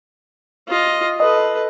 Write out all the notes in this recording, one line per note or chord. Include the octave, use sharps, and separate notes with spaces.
F4 D#5
A4 B4 D#5